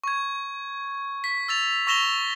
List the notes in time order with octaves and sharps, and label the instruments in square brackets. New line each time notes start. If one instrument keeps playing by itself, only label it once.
[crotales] C#6 G#6
B6
E6 A6 F7
C#6 E6 A#6 E7 F7 G7